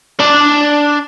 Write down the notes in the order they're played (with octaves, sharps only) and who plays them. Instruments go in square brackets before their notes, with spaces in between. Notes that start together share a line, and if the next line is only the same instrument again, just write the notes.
[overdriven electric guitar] D4 D5